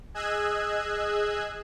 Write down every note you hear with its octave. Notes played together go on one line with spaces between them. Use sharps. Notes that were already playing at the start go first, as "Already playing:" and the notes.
G#4 D#5 E6 F#6 G#6